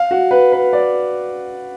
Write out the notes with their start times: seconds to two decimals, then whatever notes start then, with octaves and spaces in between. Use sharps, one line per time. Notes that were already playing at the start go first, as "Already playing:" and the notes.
Already playing: F5
0.11 F#4
0.31 B4
0.52 B4
0.73 D5